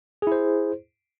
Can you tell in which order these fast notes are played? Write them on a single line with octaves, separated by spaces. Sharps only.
G#4 E4 C5